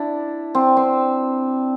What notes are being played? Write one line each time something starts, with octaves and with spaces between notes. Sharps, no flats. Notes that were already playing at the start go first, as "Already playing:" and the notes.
Already playing: D4 E4
C4
C4